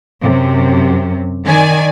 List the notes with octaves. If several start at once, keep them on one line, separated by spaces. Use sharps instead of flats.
F#2 C3
D#3 D5 G#5